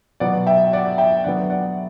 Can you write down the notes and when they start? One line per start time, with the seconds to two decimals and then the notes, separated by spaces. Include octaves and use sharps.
0.20 B2 F#3 B3 D5 F#5
0.46 E5 G5
0.73 D5 F#5
0.98 E5 G5
1.24 D3 F#3 B3 D5 F#5
1.50 D5 F#5